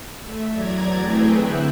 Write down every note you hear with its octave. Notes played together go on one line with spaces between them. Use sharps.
A3 E5
E2 F#3 D5 A#5 G#6
A3 C4 E4 G#4 B4 G5
D3 E5 F#6